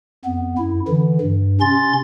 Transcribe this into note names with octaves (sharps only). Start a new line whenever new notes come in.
F2 B3
F#2 E4
D3 E3
G2
C3 C#4 C6 A6